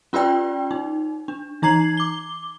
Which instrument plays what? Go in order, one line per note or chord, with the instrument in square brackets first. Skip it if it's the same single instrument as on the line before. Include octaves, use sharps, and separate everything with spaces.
[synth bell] C#4 F4 G4 B4 D5 G5
D#4
D4
E3 D#4 A#5 G#6 C7 F#7
D6 G7